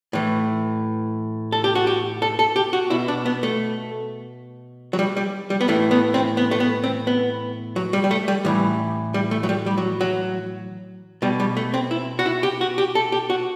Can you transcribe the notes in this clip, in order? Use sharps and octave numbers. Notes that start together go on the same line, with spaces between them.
A2 E3
A4
G4
F#4
G4
A4
A4
G4
F#4
B2 E4
D4
B3
A3
F#3
G3
G3
G3
B3
A2 E3 A3
B3
C4
B3
A3
B3
C4
B3
F#3
G3
G3
A3
G3
A2 E3 G3
G3
A3
F#3
G3
G3
F#3
F#3
B2 G3
G3
A3
C4
E4
F#4
E4
G4
F#4
G4
A4
G4
F#4